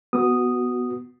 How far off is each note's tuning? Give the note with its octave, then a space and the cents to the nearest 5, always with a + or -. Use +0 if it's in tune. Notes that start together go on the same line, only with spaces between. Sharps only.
B3 +0 F#4 +0 D#6 -5